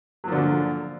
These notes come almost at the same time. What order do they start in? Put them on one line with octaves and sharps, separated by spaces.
F#3 F3 D3 A#2